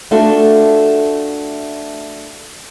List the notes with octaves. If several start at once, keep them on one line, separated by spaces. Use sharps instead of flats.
A3 D4 F4 F#4 A4